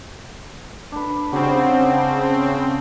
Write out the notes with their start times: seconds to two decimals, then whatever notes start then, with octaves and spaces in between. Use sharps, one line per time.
0.92 D4 B4
1.32 C#3 G3 C4 D4 F#4